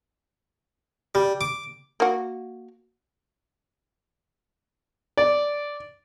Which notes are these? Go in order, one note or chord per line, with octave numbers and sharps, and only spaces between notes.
G3
D6
A#3 F#4
D5